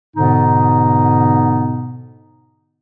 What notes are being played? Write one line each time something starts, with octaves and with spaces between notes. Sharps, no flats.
G#2 B2 D3 B3 D#4